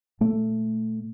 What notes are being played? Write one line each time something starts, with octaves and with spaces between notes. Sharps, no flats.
A#2 A3